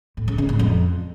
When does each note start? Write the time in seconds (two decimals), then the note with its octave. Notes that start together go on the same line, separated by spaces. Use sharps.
0.17 A2
0.28 C#3
0.38 C#3
0.49 A2
0.59 F2